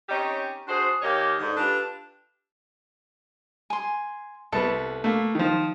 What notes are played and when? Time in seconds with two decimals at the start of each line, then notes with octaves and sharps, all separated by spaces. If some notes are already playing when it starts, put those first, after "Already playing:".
0.09 C4 C#4 D#4 G4 C#5
0.68 D4 F#4 G#4 C5
1.02 D#2 A#3 G4 C#5 D#5 F5
1.39 G#2 D3
1.57 D4 F4 G4 A4 B4
3.70 G#5 C6
4.52 C2 B3 A4 B4
5.04 A3 A#3
5.35 D#3 F3